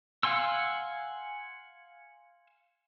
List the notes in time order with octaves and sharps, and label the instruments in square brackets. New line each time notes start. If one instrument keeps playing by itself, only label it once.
[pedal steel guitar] F5 F#5 G#5 C6 E6